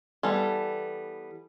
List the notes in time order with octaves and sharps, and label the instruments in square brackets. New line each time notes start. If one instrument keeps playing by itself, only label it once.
[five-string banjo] E3 G3 B3 A4